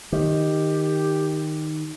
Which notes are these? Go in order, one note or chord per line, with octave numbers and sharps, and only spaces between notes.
D#3 G4